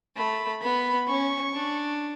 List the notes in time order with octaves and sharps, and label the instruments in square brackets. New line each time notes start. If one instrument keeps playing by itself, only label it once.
[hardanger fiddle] A3 [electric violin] B5
[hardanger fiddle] B3 [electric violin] B5
[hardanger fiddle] C#4 [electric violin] C#6
[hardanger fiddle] D4